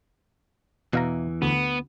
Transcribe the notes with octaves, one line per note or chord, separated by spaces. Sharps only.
E2 B2 E3 F5 A#5
D2 B3